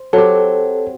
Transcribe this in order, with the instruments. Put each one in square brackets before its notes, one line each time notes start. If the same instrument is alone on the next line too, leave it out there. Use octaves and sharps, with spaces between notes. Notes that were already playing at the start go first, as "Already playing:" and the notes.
Already playing: [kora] C5
[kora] F#3 C4 G4 [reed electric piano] A4